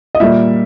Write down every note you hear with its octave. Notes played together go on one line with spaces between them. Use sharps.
D#5
A#2 G3 A#3 E5